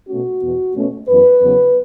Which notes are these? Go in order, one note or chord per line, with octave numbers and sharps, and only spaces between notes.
B2 A3 C#4 F#4
E2 B2 B3
B2 A3 C#4
F#2 E3 B3 B4
E2 C#3 F#3 B3